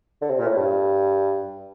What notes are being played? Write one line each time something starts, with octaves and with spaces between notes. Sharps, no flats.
D3
C3
A#2
A2
G2